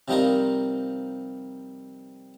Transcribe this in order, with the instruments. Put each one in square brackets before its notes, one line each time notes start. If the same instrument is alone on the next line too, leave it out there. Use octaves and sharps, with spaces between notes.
[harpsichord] C3 F3 G3 D#4 F4 A#4